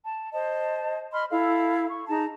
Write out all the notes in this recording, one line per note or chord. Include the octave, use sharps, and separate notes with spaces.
A5
C5 D#5 A5
D#5 B5 C6 F6
E4 A4 F5
C#6
D#4 G#4 A5 A#5